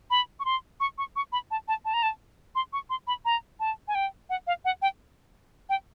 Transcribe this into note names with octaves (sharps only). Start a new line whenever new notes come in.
B5
C#6
C6
C#6
C#6
C#6
B5
A5
A5
A5
A#5
A5
C6
C#6
C6
B5
A#5
A5
G#5
G5
F#5
F5
F#5
G5
G5